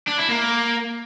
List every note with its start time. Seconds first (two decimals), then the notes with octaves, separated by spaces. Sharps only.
0.08 D4
0.19 E4
0.29 A#3